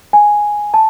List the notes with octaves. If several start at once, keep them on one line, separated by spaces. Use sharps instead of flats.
G#5
A5